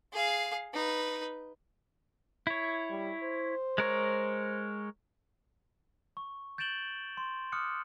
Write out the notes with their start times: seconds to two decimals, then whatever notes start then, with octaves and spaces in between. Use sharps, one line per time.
0.13 G#4 F5
0.74 D#4 B4
2.47 E4 C#5
2.90 G3
3.23 C5
3.78 G#3 A#4 C#5
6.17 C#6
6.58 G6 A6 D7 E7 F#7 G7
7.17 C6
7.52 D6 D#6 F6 F#6 C#7